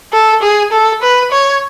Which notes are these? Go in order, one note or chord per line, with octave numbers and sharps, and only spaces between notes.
A4
G#4
A4
B4
C#5